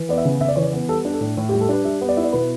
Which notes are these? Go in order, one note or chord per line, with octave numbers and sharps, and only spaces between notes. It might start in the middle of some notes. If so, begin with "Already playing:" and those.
Already playing: E3
B3 D5
E5
C#3
C#3 E5
D5
E3 C#5
D5
B3
G3 A4
D4
A4
A2
A2
G4
G3
A4
D4 B4
G3 E5
B3
D5
E4 E5
D5
B2 B4